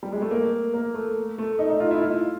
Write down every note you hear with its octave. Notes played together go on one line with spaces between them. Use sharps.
G3
G#3
A3
A#3
A#3
A3
A3
D#4
D#4
F4
E4
F4